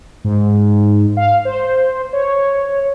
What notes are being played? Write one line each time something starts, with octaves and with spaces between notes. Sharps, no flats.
G#2
F5
C5
C#5